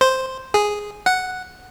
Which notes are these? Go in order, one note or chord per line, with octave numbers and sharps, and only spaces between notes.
C5
G#4
F#5